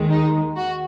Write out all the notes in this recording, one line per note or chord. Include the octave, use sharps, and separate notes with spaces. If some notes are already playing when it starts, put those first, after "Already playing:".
Already playing: D#2 D#3 G#3
D#4
F#4